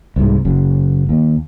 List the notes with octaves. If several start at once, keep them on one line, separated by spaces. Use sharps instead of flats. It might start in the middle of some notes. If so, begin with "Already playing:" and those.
C2 G#2
F#1 F#2
D#2